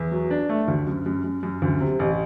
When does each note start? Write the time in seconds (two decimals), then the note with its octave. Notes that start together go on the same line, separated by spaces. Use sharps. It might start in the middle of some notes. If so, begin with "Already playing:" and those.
Already playing: E2
0.11 F#3
0.31 D4
0.49 A3
0.68 D2
0.87 F#2
1.06 F#2
1.24 F#2
1.43 F#2
1.62 D2
1.81 C3
1.99 A1